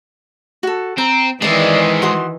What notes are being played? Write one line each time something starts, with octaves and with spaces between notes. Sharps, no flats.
F#4 A4
C4 A#5
D#3 E3 G#3 C4 D5 E5
F#4 C6 D#6